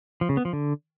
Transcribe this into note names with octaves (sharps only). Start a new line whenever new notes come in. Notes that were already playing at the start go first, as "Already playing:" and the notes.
F3
C#3
B3
F3
D3